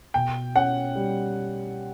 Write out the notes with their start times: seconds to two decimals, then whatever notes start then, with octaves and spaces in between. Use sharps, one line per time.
0.14 B2 G5
0.56 C#4 F#5
0.95 G3